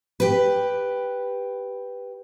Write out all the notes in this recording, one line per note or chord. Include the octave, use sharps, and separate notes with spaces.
G4 B4